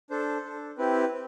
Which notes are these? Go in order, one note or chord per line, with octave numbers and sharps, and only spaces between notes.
D4 A4 C5
D4 A4
C4 E4 G4 B4
C4